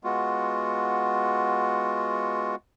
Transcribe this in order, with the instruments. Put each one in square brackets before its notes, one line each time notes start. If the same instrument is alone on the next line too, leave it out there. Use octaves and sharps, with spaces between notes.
[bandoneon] G#3 B3 F4 F#4